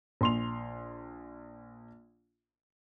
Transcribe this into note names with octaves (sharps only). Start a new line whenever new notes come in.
A#1 C6 F7